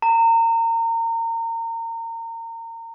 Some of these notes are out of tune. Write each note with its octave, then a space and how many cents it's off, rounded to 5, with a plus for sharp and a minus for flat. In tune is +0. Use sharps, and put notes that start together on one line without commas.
A#5 -30